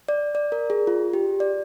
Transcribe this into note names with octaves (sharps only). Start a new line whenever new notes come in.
D5
D5
A#4
G#4
F4
G4
D5